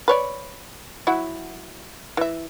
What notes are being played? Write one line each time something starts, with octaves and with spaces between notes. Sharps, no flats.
B4 C#5 D5
F#3 E4 F#4
E3 E5